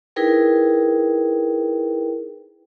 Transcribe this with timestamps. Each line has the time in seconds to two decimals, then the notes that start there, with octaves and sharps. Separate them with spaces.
0.16 D#4 E4 G#4 A#4 B4 G5